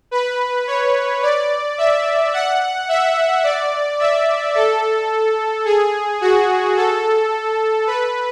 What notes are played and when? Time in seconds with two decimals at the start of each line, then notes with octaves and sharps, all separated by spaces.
0.11 B4
0.67 C#5
1.22 D5
1.78 E5
2.33 F#5
2.89 E5
3.44 D5
3.99 E5
4.55 A4
5.65 G#4
6.21 F#4
6.76 A4
7.87 B4